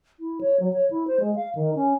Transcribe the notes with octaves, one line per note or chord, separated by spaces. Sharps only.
E4
C#5
F#3
C#5
E4
C5
G#3
F5
D#3
C#4